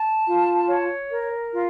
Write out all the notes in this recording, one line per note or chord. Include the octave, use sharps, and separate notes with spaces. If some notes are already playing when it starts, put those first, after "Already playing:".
Already playing: A5
F4
C#5
A#4
F4